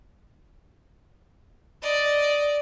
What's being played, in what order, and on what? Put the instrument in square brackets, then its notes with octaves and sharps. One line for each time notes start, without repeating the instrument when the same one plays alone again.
[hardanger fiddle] D5 D#5